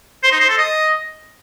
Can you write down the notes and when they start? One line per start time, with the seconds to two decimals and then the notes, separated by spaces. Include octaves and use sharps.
0.23 C5
0.32 D#4
0.41 C5
0.49 A4
0.58 D#5